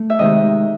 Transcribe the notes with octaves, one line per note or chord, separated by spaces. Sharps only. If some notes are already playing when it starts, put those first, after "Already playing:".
Already playing: A3
E5
C3 D#3 G#3 C4 D#5